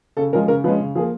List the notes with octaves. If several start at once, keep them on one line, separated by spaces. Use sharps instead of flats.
C#3 A4
F3 G#3 C#4 A#4
C#3 A#4
F3 G#3 C#4 B4
C#3
F3 A#3 G#4